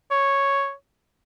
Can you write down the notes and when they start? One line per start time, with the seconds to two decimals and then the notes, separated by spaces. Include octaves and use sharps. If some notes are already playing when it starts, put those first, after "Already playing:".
0.11 C#5